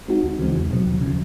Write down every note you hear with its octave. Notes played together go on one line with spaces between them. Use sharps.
G#3 C4 D#4 F#4
D2
C#3 E3 G#3 C4
E2
B2 F#3
D#2
C#3 F3